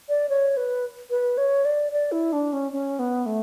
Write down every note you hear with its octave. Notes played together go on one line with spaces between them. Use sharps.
D5
C#5
B4
B4
C#5
D5
D5
E4
D4
C#4
C#4
B3
A3